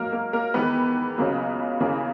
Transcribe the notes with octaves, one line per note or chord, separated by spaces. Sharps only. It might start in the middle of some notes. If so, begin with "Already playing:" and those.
Already playing: G#2 F#3 A#3 A#4
A#3 A#4
A#3 A#4
E2 D#3 G#3 B3 B4
C#2 C#3 F#3 A#3
E2 C#3 E3 A#3